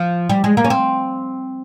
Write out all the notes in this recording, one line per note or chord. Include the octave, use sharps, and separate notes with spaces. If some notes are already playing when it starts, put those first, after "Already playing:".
Already playing: F3
G3
G#3
A#3
C#4
C4